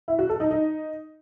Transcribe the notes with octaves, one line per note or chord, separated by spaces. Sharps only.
E4
F#4
A4
D#4
D#4